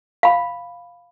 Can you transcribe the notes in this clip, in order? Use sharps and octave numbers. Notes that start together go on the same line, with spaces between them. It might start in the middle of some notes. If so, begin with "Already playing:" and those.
F5 B5